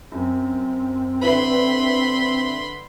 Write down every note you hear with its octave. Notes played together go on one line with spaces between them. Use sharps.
F#2 C4
D3 E4 B4 B5 C6